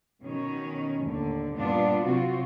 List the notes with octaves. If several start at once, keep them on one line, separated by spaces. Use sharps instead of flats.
B2 D#3 C#4
D#2 A2 D3
G2 A#2 B3 D4 F4
C3 F#3 C4 F4 F#4